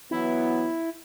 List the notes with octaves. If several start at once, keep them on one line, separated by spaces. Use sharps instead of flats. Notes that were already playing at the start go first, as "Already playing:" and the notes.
E3 F#3 B3 E4